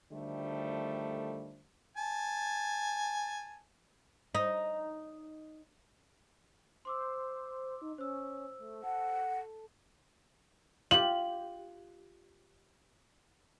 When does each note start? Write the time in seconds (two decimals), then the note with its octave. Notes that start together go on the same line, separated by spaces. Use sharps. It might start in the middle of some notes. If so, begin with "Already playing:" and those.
0.11 D2 D3 D#3 F3 G3 A3
1.97 G#5 A5
4.35 D#4
6.85 C5 C6 D6 E6
7.82 D#4
7.98 C#4 C5 E6
8.59 A3
8.84 A4 F#5
10.91 F4 G4 F#7